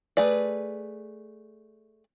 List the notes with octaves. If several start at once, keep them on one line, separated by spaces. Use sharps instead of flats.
A3 G#4 B4 D5